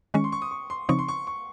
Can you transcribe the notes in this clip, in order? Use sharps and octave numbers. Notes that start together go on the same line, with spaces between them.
D#3 G#3 C#4 C#6
C6
C#6
D#6
C#6
C6
C#3 F3 C4 D#4 C#6
C6
C#6
C#6